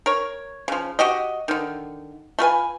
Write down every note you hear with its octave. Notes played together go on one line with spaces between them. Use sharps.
A#4 C#5
C#3 F3
F#4 G4 D#5
D3 D#3
A3 F4 B4 G#5